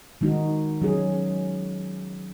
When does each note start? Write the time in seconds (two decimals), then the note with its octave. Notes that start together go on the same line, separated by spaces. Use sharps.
0.21 D#3 G#3 D#4 F#4
0.82 F#3 C#4 G#4